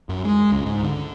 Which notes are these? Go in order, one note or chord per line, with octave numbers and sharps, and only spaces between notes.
F#2
G#3
C#2
G#2
D3